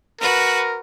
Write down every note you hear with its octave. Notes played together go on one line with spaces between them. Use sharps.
F#4 A#4 B4